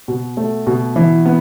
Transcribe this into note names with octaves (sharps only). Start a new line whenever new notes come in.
B2
A3
B2
E3
B3